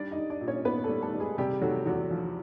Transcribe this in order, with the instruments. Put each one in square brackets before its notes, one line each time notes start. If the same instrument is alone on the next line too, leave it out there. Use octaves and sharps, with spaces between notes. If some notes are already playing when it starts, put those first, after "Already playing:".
Already playing: [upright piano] G3 D4 D5
D#4 D#5
G3
D4 D5
A#2
C#4 C#5
A#2 B3 B4
A3 A4
G3
A3 A4
G3
G#3 G#4
C3 G3 G4
F#3 A3 F#4
E2 F#3 F#4
F3